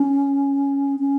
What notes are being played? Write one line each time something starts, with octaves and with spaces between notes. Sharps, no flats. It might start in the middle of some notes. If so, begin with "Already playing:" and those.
Already playing: C#4
C#4